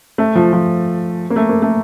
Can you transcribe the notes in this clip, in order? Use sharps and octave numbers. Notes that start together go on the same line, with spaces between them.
A3
F3
F3
A#3
A3
A#3
A3